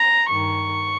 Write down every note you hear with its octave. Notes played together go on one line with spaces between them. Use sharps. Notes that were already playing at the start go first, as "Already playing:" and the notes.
Already playing: A#5
G2 D#3 C#6